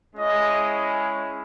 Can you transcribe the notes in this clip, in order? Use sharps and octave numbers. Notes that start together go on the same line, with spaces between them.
G#3 C#4 E4 D#5